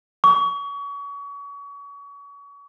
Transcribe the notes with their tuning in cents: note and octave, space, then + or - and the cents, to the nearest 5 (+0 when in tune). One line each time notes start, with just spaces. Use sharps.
C#6 +35